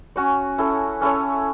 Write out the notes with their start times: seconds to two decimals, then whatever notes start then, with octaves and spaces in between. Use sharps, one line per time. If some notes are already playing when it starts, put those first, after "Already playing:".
0.16 C#4 F#4 C#5
0.58 C#4 E4 A4 C#5
1.01 C#4 E4 A4 C#5